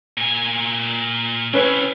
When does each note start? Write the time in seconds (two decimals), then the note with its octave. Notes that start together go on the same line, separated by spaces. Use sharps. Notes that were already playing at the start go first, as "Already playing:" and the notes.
0.17 A#2 G#5
1.54 C4 C#4 E4 B4 C#5